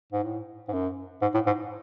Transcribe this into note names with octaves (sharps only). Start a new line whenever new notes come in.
G#2
A2
G#2
F#2
G#2
A2
G#2